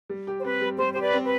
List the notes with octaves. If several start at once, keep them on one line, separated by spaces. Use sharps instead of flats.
G3
G4
C5
C4 B4
G3
G3 C5
G4 C5
B4 D5
C4
B4